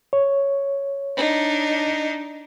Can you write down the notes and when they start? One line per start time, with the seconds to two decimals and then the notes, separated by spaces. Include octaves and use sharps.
0.13 C#5
1.16 D4 D#4